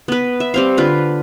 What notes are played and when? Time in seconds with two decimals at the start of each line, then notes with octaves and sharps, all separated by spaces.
0.08 B3 B4
0.40 E5
0.54 G3 C4 F5
0.77 D3 F4 B4